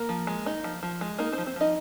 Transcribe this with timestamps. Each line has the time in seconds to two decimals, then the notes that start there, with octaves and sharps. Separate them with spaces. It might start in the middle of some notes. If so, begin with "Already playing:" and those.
Already playing: A#3 A#4
0.09 F3
0.27 G#3
0.46 D#4
0.64 F3
0.83 F3
1.01 G#3
1.18 A#3 D#4 A#4
1.32 C4 C5
1.38 F3
1.46 C4 C5
1.56 F3 D#4 D#5